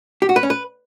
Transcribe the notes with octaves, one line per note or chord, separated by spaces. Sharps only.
G4
F#4
B4
C#4
B4